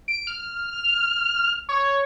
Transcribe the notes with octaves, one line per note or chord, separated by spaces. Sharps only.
D7
F6
C#5